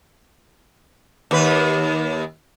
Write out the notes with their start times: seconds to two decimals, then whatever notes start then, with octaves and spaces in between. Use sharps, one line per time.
1.31 D#2 B4